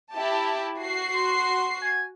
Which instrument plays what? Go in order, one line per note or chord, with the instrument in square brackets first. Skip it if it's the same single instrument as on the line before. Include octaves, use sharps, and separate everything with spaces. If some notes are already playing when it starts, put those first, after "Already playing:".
[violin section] E4 G4 A5
F#4 C7
[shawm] C6
G#5